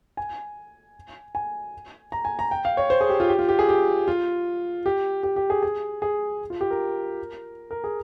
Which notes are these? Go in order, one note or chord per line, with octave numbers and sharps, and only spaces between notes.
G#5
G#5
A#5
G#5
A#5
G5
F5
C#5
C5
G#4
G4
F4
G4
F4
G4
G#4
G4
F4
G4
G4
G4
G#4
G#4
G#4
F4
G4
A#4
A#4
G#4